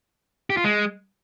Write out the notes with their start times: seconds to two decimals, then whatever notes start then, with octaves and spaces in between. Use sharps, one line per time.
0.50 G4
0.57 F4
0.64 G#3